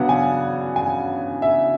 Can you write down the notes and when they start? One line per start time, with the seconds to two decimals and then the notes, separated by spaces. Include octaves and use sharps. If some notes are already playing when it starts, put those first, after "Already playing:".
Already playing: C#3 F#3 B3 D4 F#5
0.09 G#5
0.76 G#5
1.42 E5